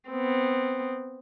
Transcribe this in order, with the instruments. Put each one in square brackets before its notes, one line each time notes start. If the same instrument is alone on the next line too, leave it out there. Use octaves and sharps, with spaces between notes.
[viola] B3 C4